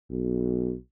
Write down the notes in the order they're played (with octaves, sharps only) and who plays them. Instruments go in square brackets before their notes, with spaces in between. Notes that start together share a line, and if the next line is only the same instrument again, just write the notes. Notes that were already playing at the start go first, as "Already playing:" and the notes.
[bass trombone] B1